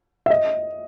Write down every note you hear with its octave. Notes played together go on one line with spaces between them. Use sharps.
E5
D#5